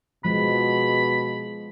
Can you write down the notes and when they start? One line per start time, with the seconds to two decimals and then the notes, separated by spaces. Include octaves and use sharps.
0.25 B2 F3 G#3 B5